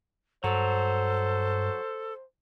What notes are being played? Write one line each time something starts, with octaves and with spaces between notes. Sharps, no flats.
G2 F#3 A4 C5